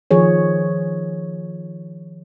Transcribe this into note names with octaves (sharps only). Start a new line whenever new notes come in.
D#3 F3 G#4 C#5